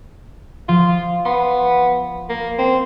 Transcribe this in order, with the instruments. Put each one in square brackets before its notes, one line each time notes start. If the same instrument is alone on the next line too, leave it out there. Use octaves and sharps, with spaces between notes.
[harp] F3 [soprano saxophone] F4
[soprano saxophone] B3 [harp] C6
[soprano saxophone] A#3
C4